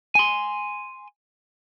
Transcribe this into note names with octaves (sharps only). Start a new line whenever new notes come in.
G#5 C6